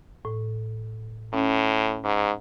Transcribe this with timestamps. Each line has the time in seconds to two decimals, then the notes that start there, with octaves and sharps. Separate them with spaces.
0.25 A2
1.33 A2 C#4
2.04 G#2